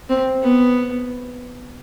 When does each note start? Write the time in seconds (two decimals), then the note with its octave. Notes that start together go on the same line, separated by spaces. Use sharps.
0.09 C4
0.42 B3